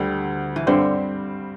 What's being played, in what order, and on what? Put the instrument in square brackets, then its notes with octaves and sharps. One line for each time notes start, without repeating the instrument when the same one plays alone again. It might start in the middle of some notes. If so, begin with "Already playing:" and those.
Already playing: [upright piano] D2 D3 G3
[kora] E3
[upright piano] G2 G3 C4 G4 C5 [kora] D3